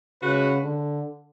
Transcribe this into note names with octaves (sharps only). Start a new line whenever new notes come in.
C#3 G#3 C#4 F#4 B4
D3